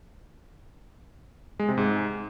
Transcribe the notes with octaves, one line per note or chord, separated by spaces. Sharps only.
G#3
C3
G#2